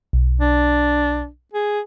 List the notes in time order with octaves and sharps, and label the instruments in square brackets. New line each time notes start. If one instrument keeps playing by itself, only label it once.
[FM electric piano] B1
[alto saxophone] D4
G#4